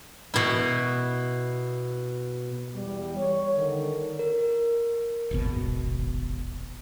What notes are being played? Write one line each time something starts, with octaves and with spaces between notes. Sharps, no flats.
B2 E4
E2 G3
C#5
D3 D#3
A#4
D#1 G#1 B2